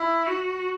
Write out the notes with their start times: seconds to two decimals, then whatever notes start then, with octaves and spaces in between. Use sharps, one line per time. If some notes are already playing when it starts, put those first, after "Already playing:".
Already playing: E4
0.27 F#4